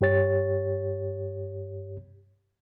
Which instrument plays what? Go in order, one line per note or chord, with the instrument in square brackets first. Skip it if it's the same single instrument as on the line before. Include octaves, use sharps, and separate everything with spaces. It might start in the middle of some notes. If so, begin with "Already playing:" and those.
[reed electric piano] G2 G4 C#5 A6